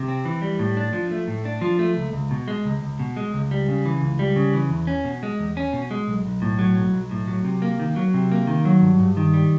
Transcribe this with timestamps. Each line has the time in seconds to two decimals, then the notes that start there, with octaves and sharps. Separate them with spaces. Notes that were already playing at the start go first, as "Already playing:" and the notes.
Already playing: C3
0.08 C4
0.25 E3
0.42 G3
0.59 A2
0.77 D4
0.93 F3
1.11 A3
1.28 A2
1.45 D4
1.61 F3
1.79 A3
1.97 C#2
2.13 C#2
2.31 B2
2.48 G#3
2.66 C#2
2.83 C#2
3.00 B2
3.17 G#3
3.34 C#2
3.51 G3
3.68 C#3
3.85 E3
4.02 C#2
4.19 G3
4.36 C#3
4.54 E3
4.70 E2
4.87 C#4
5.05 B2
5.23 G#3
5.40 E2
5.57 C#4
5.73 B2
5.91 G#3
6.08 B1
6.25 B1
6.42 A2
6.59 F#3
6.77 B1
6.94 B1
7.11 A2
7.28 F#3
7.45 C3
7.62 A#3
7.80 D#3
7.96 F#3
8.14 C3
8.32 A#3
8.47 D#3
8.65 F#3
8.82 G2
9.00 G2
9.17 D#3
9.34 G3